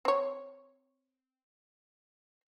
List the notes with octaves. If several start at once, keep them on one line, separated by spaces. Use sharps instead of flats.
C4 C#5